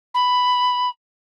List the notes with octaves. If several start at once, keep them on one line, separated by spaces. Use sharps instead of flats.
B5